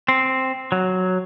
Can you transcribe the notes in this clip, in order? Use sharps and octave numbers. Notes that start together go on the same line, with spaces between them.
C4
F#3